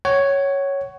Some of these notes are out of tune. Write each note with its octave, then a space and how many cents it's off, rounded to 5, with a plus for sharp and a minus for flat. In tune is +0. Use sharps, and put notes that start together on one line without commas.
C#5 +0 F#5 +30